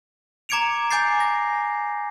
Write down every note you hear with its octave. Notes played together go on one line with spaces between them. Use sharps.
A#5 D6 G#6 C#7 D7 F7
G#5 D6 G6 A6 C7
A#6